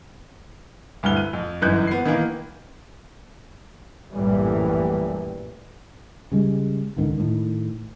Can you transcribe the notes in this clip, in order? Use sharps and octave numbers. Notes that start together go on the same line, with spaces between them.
D2 G2 E4 F6 G7
F#6 D#7
F2
G1 F#2 E3 D#4 F#6 G6
B3 C7
D#3 E3 A#3
A#1 F#2 A2 E3 G3
C#3 G3 G#3
C#2 G#2 D3 D#3
A2 D#3